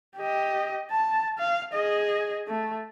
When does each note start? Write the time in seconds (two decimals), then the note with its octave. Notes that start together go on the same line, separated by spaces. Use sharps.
0.18 G4 D#5
0.91 A5
1.39 F5
1.74 G#4 D#5
2.48 A3